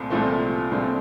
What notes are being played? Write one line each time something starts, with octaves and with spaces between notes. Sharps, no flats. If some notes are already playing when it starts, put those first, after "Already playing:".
Already playing: C2 A#2 A3 C4
C2 A#2 F3 A3 C4
C2 A#2 F3 A3 C4